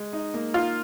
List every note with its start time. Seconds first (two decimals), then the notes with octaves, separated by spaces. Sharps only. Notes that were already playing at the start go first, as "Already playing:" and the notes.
Already playing: G#3
0.13 D#4
0.34 A#3
0.54 D#4 F4